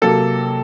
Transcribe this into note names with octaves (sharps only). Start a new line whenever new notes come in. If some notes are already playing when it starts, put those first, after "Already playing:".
C3 F#3 A#3 A4